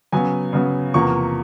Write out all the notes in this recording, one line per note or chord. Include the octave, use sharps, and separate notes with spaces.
C#3 F#3 B3 G#5
C#3 F#3 B3
E2 C3 F3 A#3 C#6